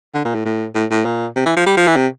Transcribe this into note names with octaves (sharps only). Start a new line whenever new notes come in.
D3
A#2
A2
A2
A2
A2
A#2
C3
E3
F3
G3
F3
E3
C3